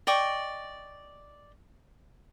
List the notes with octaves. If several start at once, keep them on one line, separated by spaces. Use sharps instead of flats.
D5 D#5 G5 C#6